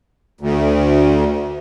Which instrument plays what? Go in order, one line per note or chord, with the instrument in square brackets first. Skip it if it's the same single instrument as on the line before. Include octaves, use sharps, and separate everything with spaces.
[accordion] D2